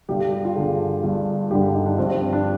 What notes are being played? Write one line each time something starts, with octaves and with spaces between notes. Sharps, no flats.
G1 G2 D3 G4
G4
G4
F4
G1 G2 D3 G#4
G1 G2 D3
G1 G2 D3 G4
D#4
D4
G1 G2 F3 C4
C4
C4
D4